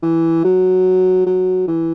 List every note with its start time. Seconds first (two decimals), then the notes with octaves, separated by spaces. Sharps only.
0.03 E3
0.44 F#3
1.26 F#3
1.68 E3